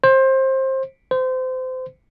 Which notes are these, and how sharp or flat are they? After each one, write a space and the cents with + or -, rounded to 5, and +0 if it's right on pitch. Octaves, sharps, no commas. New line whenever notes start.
C5 +25
C5 -25